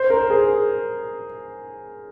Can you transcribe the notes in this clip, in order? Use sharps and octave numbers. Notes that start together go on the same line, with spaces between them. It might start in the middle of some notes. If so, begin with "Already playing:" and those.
Already playing: C5
A#4
G#4